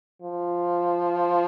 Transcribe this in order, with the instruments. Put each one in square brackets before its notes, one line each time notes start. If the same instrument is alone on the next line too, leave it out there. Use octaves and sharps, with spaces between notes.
[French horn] F3